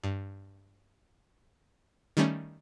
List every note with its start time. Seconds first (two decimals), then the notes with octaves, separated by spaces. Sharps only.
0.04 G2
2.17 D#3 G3 A3 C#4